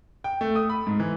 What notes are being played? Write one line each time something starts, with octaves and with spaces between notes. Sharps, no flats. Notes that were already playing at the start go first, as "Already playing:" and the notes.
G5
A3
D#6
B5
G#2
E3